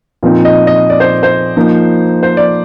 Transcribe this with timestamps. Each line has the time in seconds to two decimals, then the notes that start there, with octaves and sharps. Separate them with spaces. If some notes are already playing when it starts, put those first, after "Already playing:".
0.23 A#2 F3 C4 D#4
0.45 D#5
0.67 D#5
0.90 D5
1.00 C5
1.23 C5
1.56 F3 A#3 D#4
2.23 C5
2.37 D5